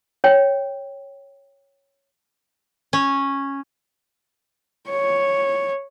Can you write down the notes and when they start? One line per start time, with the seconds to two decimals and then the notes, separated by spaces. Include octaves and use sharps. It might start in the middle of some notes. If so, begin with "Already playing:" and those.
0.24 C#5 G5
2.93 C#4
4.90 C#5